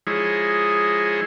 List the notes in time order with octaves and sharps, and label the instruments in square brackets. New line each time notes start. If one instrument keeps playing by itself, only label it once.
[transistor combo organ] F3 G#3 D#4 E4 G#4 C#5